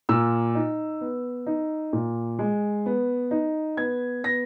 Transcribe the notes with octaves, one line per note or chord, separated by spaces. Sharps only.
A#2 E6
D#4
B3
D#4
A#2
G#3
B3
D#4
B3 G#6
B3 A#6